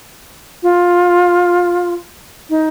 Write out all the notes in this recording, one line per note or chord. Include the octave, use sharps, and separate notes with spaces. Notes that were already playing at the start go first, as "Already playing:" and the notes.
F4
D#4